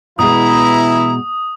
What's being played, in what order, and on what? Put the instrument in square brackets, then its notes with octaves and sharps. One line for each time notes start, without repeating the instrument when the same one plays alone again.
[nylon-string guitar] B2 G#3 [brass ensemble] E3 E4 [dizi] A#5 [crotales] D#6